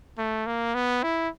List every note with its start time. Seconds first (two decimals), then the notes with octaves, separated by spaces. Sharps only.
0.18 A3
0.46 A#3
0.75 B3
1.03 E4